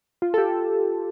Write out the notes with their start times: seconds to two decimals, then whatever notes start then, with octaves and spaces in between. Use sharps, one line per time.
0.22 F4
0.34 A4
0.38 G4